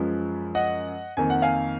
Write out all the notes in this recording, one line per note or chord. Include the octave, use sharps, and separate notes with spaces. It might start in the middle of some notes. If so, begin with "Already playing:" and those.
Already playing: F#2 F3 G#3 B4
D#5 F#5
F2 D#3 A#3 G#5
F#5
F5 G#5